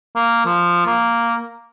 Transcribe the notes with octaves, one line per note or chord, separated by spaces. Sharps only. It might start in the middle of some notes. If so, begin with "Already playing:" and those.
A#3
F3
A#3